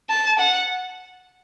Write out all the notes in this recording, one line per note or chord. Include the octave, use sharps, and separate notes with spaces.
A5
F#5